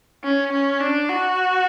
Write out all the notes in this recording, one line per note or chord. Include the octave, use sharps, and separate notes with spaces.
C#4
C#4
D4
F#4